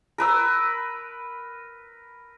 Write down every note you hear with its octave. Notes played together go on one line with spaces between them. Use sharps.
A#4 B4 E6